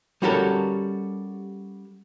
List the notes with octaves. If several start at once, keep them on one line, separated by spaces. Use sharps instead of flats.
G3 C#4 F#4 G4 A4 A#4